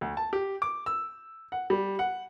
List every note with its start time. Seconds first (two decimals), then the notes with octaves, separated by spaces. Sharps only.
0.01 D2
0.17 A5
0.33 G4
0.62 D6
0.86 E6
1.52 F#5
1.70 G3
1.99 F#5